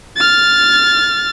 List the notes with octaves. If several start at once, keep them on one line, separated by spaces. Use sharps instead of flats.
F6 A6